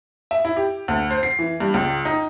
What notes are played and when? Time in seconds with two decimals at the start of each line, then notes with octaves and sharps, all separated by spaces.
0.31 E5
0.45 E4
0.56 G4
0.88 D2
1.10 C5
1.23 C7
1.39 E3
1.60 G2
1.74 C#2
2.05 D#4